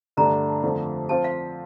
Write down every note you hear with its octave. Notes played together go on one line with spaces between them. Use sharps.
G2 D3 A3 D4 A#5
F2 D3 F3 A3
F3 C4 F4 C5 A5
F5